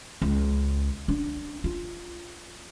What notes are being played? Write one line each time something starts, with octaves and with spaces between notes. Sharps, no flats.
C#2
D4
F4